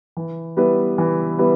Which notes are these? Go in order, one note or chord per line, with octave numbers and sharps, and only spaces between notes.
E3
G3 B3 E4 B4
E3
G3 B3 E4 B4